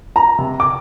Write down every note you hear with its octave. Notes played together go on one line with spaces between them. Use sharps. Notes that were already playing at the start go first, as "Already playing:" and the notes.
A#5
C3
D6